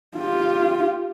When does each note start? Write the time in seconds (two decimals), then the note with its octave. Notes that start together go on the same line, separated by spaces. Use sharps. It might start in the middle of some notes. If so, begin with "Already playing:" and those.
0.18 F4 G4